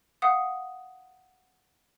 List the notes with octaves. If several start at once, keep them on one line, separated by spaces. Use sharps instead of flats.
F5 F#5 D#6